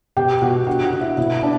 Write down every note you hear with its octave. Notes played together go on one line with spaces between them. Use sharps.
B2 G4 G5
B2 F#4 F#5
D3 F#4 F#5
F#4 F#5
D3
E4 E5
B2 E4 E5
D4 D5